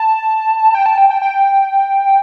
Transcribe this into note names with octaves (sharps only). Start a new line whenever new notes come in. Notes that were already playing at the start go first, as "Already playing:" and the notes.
Already playing: A5
G5
A5
G5
G5
G5